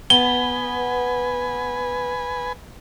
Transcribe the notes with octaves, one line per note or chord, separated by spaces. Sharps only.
B3 B4 G#5 G7